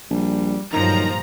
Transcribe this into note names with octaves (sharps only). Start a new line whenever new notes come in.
A#1 G3
G2 A#2 D#3 F3 F#3 A#5